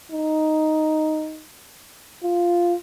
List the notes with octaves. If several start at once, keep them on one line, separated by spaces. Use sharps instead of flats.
D#4
F4